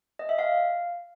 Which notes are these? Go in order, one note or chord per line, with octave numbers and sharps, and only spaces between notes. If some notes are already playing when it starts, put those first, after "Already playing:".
D#5
E5
F5